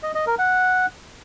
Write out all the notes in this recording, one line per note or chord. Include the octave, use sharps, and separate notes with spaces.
D#5
D#5
A#4
F#5